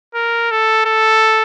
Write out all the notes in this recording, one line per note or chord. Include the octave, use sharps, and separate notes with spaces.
A#4
A4
A4